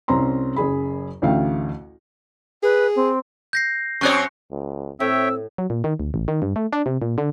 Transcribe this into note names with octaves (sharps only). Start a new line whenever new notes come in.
C2 C4 C#4 A#5 C6
F#1 F#2 G#4 B5
A1 D2 A3 F5 G5
G#4 B4
C4
G6 A#6 C7
F#2 C4 C#5 C#6 F#6 C#7
C#2
A2 C4 C#5 E5 G5 E6
F#3
A#2
D#3
D2
A1
D#3
G2
A3
D4
C3
A#2
D3